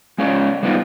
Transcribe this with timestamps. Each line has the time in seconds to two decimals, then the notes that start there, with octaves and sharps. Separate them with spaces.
0.18 G#3 C#4 F4 C#5 D5
0.63 G3 B3 C4 D#4 F4